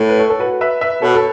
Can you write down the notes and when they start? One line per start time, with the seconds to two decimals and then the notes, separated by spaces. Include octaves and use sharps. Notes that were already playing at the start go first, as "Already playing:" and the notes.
Already playing: A2
0.09 B4
0.19 A4 C#5
0.30 A4
0.39 F#4 B4
0.61 B4 E5
0.81 B4 E5
1.02 B2 A4 C#5
1.15 A4